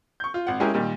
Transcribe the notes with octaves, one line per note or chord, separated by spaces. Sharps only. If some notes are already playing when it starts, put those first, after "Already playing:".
C#6 G6
F4
G#1 F#5
G#3 C#4 E4 G4 G#4 A#4
A#2 D#3 G3